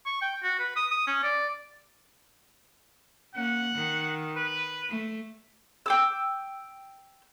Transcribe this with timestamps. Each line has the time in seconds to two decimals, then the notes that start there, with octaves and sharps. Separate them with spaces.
0.06 C#6
0.22 G5
0.43 F#4
0.60 B4
0.76 D#6
0.91 D#6
1.07 C#4
1.23 D5
3.35 A#3 C#4 F#5
3.75 D#3
4.36 B4
4.89 A3
5.86 G5 D6 E6